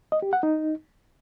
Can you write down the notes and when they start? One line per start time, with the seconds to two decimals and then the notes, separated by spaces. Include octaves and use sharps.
0.12 D#5
0.22 G4
0.33 F#5
0.43 D#4